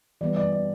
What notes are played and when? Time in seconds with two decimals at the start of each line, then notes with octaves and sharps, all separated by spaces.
0.21 E3 G3 B3 D5
0.36 D5
0.52 D5